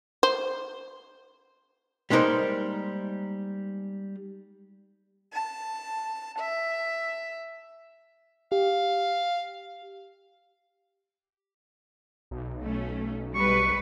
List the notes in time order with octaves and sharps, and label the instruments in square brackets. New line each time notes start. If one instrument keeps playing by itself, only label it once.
[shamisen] C5
[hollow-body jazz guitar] G3 G#3 A#3 D#4 A#4 C5
[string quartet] A5
E5
[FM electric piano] G4 [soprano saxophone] F5
[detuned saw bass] B1
[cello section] A3 C#4
[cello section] G3 B4 [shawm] C#6